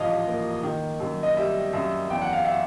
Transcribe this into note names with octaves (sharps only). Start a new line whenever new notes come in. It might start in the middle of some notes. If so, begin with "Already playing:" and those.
Already playing: A1 G#2 F3 D#5 F5
A#3
D#3
F#2
D#5
G3 E5
F#2 E5
E2 G5
F#5
F5
E5 F#5